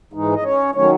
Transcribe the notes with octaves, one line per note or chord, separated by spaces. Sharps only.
G#2 E3 G#3 D#4
D#5
C#4 C#5
D#3 F#3 A3 C#4 C#5